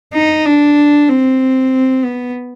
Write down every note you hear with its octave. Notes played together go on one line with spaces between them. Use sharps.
D#4
D4
C4
B3